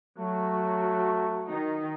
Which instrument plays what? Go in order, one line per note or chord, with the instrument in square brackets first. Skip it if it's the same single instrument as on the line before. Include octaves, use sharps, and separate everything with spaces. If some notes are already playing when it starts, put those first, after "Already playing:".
[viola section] F#3 F#4 [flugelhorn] A3
[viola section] D#3 D#4